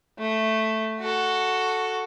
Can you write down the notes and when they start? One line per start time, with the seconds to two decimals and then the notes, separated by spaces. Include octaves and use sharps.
0.19 A3
1.00 F#4 A4